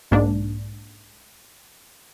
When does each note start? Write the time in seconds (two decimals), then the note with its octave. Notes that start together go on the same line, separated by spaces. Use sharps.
0.11 B1 G#2 A#3 D4